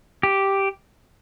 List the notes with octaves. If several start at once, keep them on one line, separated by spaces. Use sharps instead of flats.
G4